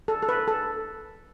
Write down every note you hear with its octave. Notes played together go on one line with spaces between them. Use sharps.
A4
A4
B4
A4